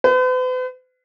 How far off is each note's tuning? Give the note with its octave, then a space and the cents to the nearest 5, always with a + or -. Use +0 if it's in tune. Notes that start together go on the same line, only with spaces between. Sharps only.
B4 +45